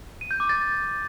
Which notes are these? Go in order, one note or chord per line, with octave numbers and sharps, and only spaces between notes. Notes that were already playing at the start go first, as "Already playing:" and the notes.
D#7
G6
D6
A6